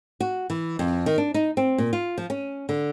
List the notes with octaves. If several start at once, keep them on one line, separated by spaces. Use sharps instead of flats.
F#4
E3
F2
D#3
D4
D#4
C4
A#2
F4
F3
C#4
D3